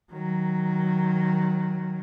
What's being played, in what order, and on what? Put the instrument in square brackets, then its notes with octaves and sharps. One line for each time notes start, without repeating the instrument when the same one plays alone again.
[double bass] D#3 F#3